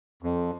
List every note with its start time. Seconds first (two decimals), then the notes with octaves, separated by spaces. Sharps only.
0.22 F2